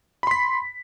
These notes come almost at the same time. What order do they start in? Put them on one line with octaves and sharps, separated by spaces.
B5 C6 B6